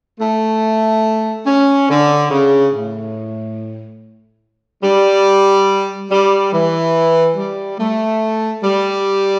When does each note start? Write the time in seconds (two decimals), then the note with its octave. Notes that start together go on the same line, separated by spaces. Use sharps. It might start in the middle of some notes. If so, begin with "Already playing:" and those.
0.20 A3
1.47 C#4
1.89 D3
2.31 C#3
2.73 A2
4.83 G3
6.11 G3
6.53 E3
7.36 G3
7.78 A3
8.63 G3